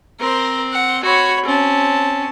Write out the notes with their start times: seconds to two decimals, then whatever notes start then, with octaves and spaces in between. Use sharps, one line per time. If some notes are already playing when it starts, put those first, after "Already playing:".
0.20 C4 A#4 C5
0.73 F#5
1.03 F#4 C#5 B5
1.46 C4 C#4 A5